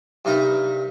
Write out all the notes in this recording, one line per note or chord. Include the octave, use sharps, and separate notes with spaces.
G2 C3 D#4 A#4 B4